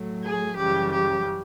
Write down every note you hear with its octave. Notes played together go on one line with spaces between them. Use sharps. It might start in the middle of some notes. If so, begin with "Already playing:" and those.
Already playing: A2 F#3 A3
G#4
F#2 C#3 E3 G3 G4
G4